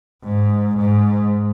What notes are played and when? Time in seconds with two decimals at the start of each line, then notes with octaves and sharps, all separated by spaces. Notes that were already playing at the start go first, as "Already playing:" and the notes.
0.24 G#2
0.77 G#2